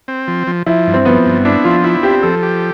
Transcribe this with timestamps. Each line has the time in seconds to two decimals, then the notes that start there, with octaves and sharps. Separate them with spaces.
0.08 C4
0.28 F3
0.47 F3
0.66 F3 E4
0.87 G2
0.94 C4
1.05 F3 B3
1.26 G2
1.45 D4 E4
1.64 F3 F4
1.84 E4 F4
2.03 C4 G4
2.23 F3 A4
2.43 G4